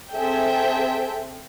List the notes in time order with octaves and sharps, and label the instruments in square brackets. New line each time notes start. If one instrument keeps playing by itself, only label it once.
[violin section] C4 G#4 A4 E5 G5